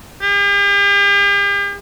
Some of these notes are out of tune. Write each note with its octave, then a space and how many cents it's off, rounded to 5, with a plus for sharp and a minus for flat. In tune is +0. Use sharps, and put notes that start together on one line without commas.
G4 +45